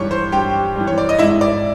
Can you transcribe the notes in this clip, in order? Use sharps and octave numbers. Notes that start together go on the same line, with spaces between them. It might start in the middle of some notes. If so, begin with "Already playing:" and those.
Already playing: G2 E3 G3 C#5 C#6
C5 C6
G2 G4 G5
E3 G3
C#5
D5
D#5
G#2 E4 E5
D5